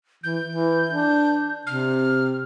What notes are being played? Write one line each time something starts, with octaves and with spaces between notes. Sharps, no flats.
E3 G6
E3
D4
C3 F6